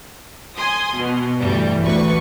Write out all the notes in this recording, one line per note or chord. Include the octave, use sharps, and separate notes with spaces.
G#5 C6 D#6
B2
D2 G2 E3 G3
A1 D2 B4 C#6